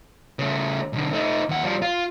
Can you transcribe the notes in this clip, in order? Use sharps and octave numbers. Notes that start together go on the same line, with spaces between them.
C#3 A3
B1 D3
A3 D#4
D#2 F#5
F3 G3
F4